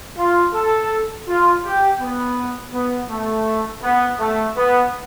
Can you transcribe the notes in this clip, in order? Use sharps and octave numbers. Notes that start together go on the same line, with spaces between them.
F4
A4
F4
G4
B3
B3
A3
B3
A3
B3